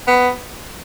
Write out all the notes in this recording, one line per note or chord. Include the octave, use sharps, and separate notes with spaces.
B3